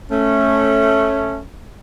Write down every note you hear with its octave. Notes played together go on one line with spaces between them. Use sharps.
A3 C#4